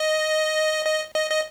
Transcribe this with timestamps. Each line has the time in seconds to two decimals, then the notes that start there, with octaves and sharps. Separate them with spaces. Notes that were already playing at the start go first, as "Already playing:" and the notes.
Already playing: D#5
0.85 D#5
1.15 D#5
1.30 D#5